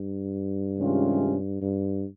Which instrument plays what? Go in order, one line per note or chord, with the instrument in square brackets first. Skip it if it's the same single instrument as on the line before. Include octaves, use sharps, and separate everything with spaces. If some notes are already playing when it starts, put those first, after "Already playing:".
Already playing: [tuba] G2
[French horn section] C3 D#3 G#3 C#4 F4
[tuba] G2